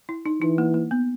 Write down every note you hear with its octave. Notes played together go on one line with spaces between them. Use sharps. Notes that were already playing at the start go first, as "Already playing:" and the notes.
E4
D#4
E3 D#4
A#3
A#3
B3